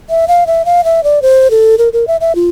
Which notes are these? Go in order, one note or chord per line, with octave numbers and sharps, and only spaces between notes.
E5
F5
E5
F5
E5
D5
C5
A4
A#4
A#4
E5
E5
F4